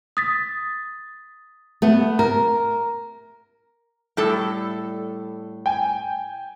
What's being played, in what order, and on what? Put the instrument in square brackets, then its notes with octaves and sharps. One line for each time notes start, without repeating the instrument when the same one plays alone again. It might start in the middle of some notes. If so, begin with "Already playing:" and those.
[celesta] D#6 A6 B6
[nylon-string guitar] A3 B3
[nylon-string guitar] A#4 [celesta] A#5
[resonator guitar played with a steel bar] A2 G3 A4
[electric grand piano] G5 G#5